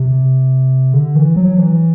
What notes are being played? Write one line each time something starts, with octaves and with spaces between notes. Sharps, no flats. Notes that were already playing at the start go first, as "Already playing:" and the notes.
Already playing: C3
D3
E3
F#3
E3